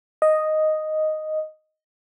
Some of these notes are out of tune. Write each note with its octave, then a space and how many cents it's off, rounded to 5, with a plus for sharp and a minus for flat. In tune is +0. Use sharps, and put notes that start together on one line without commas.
D#5 +0